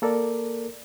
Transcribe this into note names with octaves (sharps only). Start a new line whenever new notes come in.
A#3 A4 A#4 D5